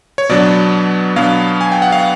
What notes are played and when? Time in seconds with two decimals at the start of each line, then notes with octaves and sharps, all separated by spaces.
0.18 C#5
0.29 B2 F#3 B3 D4 D5
1.16 B2 F#3 B3 D4 F5
1.61 G#5
1.71 G5
1.82 F#5
1.92 F5